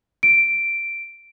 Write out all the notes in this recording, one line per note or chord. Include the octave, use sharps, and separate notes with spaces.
D7